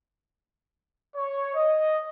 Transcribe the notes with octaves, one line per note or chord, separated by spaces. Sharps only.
C#5
D#5